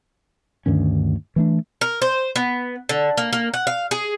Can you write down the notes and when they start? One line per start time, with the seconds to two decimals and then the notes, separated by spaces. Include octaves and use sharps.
0.66 D2 G2 D#3 C#4
1.36 E3 A3 D4
1.81 A#4
2.02 C5
2.36 B3
2.89 D3
3.18 A#3
3.33 A#3
3.54 F#5
3.67 F5
3.91 G#4